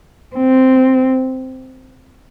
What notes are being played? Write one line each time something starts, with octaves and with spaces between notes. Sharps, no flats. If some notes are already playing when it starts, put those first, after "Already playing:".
C4